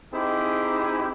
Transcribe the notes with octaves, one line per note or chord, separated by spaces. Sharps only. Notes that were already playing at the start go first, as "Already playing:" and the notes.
C4 D#4 E4 G4 G#4